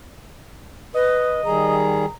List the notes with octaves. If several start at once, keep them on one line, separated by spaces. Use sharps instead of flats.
B4 D#5
D#3 G3 G#4 A#5